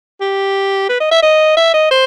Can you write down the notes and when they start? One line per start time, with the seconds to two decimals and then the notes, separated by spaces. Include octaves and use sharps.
0.21 G4
0.89 B4
1.00 D#5
1.11 E5
1.23 D#5
1.57 E5
1.74 D#5
1.91 C5